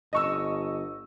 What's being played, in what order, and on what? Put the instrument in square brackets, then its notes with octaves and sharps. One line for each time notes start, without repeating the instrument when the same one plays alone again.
[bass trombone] G1 [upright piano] D#5 C#6 E6